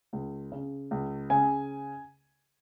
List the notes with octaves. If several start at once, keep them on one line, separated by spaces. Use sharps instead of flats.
C#2
C#3
C#2
C#3 G#5